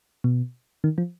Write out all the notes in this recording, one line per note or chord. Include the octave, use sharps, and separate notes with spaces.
B2
D#3
F3